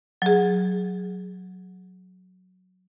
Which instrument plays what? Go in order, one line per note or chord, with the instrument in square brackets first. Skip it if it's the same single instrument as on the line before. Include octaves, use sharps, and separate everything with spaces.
[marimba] F#3 G#4